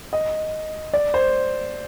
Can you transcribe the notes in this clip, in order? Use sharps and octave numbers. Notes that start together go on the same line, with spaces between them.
D#5
D5
C5